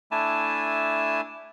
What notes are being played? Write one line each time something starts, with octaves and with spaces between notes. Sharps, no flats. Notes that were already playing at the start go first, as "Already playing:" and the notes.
A3 D4 E4 G#5 A5